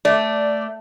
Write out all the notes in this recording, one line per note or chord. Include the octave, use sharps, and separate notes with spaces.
A3 D5